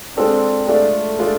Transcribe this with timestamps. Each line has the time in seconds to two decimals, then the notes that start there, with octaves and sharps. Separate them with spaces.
0.17 G#3 C4 D4 F4 A4 D5
0.68 G#3 A3 D4 F4 A4 D5
1.19 G#3 D4 F4 A4 D5